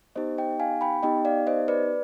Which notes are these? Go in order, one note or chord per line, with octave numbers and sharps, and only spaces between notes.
B3 D#4 G4 C5 D#5
D#5 G5
F5 G#5
G5 B5
B3 D#4 G4 D#5 G5
D5 F5
C5 D#5
B4 D5